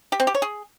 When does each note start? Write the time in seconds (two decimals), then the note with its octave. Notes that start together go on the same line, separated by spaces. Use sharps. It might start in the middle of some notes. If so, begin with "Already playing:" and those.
0.12 G4
0.20 C4
0.27 G4
0.35 C#5
0.42 G#4